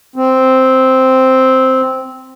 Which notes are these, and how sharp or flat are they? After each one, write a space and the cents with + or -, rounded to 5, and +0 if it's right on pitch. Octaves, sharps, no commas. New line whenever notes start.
C4 -5